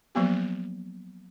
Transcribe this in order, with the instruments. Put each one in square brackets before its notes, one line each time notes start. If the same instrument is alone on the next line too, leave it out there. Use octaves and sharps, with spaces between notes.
[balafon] F3 F#3 A#3 B3 G4